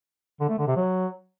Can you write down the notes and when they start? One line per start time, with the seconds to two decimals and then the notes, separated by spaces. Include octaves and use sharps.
0.40 D3
0.49 A3
0.58 D3
0.67 C3
0.76 F#3